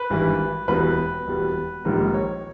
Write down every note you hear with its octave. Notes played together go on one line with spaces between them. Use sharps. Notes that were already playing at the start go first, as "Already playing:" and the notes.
Already playing: B4
G#1 G2 E3 G3
E1 E2 B2 G3 B4
E1 E2 B2 G3
A#1 G#2 D#3 G3 A#3 A#4
C#5